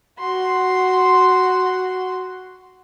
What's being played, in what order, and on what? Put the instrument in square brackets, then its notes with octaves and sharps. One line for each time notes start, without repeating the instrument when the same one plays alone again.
[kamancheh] F#4 C6